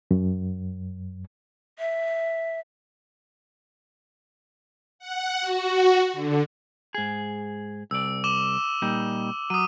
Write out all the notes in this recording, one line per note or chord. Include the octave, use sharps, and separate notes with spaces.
F#2
E5
F#5
F#4
D3
G#2 G#4
C2 D5 E6
D6 E7 G7
A#2 G3 D#4
F#3 D#6 D#7